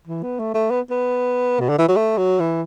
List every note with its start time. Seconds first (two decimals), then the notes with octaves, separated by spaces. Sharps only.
0.07 E3
0.23 B3
0.39 A3
0.54 A3
0.70 B3
0.90 B3
1.60 B2
1.69 D3
1.78 E3
1.88 F#3
1.96 A3
2.18 F#3
2.40 E3